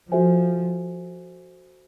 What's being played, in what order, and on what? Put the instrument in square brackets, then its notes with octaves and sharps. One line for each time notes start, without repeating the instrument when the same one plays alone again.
[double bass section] F3 [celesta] F#4 A4 C5 E5 G#5